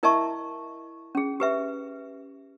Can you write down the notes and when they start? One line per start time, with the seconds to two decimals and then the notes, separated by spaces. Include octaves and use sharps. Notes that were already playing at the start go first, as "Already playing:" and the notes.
0.03 E4 A#4 D#5 E5 A5 C#6
1.15 C#4 G#4
1.40 G4 B4 E5